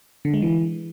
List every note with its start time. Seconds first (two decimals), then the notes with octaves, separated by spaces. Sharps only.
0.25 D3
0.34 G#3
0.42 E3